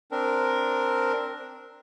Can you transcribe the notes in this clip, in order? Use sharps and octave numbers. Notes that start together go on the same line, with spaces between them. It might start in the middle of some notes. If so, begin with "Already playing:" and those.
C4 D4 A#4